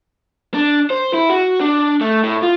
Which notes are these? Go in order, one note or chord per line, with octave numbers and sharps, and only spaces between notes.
D4
C5
E4
F#4
D4
A3
A2
F4